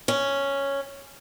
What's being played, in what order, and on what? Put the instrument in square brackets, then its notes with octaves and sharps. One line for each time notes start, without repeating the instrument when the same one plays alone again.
[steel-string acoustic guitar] C#4